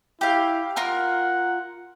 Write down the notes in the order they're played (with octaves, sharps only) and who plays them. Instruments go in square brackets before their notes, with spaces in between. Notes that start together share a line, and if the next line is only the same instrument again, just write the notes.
[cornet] E4 [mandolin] G4 F5
[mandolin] F4 A#4 F6 [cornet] F#5